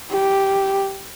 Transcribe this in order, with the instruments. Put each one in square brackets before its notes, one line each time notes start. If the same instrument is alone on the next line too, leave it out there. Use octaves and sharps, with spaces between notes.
[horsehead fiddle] G4